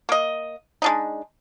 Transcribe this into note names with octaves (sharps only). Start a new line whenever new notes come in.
A#3 D#5
G#3 D4 D#4